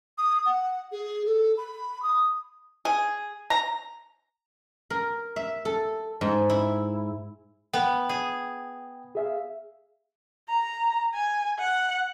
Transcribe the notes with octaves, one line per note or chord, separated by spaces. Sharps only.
D#6
F#5
G#4
A4
B5
D#6
G#4
A#5
A#4
E5
A4
G#2
E4
B3 G5
G#4
G#4 E5 F5
A#5
G#5
F#5